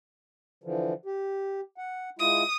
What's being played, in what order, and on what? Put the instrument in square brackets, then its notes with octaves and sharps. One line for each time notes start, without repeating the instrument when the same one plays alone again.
[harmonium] D3 E3 F3
G4
F#5
[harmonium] G#3 E4 F4 [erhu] D#6